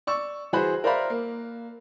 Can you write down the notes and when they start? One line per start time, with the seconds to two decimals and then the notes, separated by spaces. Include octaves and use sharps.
0.07 D5 C#6 E6
0.53 E3 F#4 G#4 C5 B5 F#6
0.84 A#4 C5 D5 E5 F5 B5
1.10 A#3